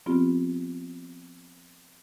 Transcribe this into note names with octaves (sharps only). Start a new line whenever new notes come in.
F3 B3 C4 F4 G4